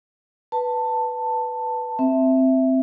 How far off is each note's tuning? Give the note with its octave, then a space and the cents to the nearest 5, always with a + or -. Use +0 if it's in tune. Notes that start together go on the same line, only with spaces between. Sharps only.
B4 +0 A5 +10
C4 +0 E5 +0